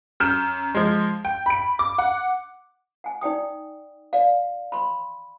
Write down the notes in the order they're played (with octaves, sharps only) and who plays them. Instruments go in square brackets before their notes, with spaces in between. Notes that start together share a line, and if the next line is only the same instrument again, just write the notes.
[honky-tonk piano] F#2 F6 G6 E7
F3 G#3
G5
B5 D7
D6
F#5
[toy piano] F#5 G#5
D#4 D5 G5 D#6
D5 F5
B5 C6